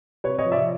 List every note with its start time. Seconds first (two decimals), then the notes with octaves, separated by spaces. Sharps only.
0.24 C3 B4 C#5
0.39 C#5 D#5
0.45 F3
0.52 D5 E5